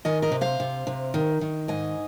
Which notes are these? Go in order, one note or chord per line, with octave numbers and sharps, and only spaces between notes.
D#3 D#5 G#5
A#4 D#5
C3
C5 F5
C3
C3
D#3
D#3
G#2 D#5 G#5